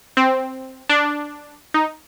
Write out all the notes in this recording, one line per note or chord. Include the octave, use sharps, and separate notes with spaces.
C4
D4
D#4